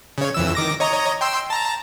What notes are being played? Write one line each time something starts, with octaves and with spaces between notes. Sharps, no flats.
C#3 C#5
F2 E3 E6
D#3 D6 A#6
C#5 D#5 A#5
G5 C6 E6
A5 A#5